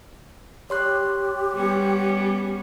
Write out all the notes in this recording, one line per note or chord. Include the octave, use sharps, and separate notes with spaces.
G4 C#5 C6 F#6
G3 B3 C#4